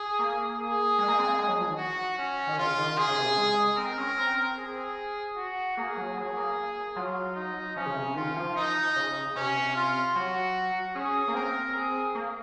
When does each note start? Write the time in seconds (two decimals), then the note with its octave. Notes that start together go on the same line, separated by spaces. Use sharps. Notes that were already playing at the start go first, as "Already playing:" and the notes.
Already playing: G#4
0.19 A#3
0.58 G#4
0.98 G#3
1.08 A#3
1.19 C4
1.28 A#3
1.38 G#3
1.48 F#3
1.58 F3
1.68 D#3
1.78 F#4
2.18 C#4
2.47 D#3
2.58 C#3 F4
2.78 D#3
2.97 G#4
3.08 C#3
3.18 C3
3.28 C#3
3.38 G#3
3.77 C4 A#4
3.98 C#4
4.18 C4
4.57 G#4
5.37 F#4
5.77 A#3 G#4
5.97 F#3
6.17 F#3 G#4
6.37 A#3
6.96 F#3 F4
7.36 D#4
7.76 F3 C#4
7.86 C#3
7.96 C3
8.06 C#3
8.16 D#3 F4
8.36 F3
8.56 D#4
8.96 C#3
9.36 C3 C#4
9.76 F4
10.15 F#3 F#4
10.95 C#4 G#4
11.28 A#3
11.35 C4 A#4
11.75 G#4
12.15 A#3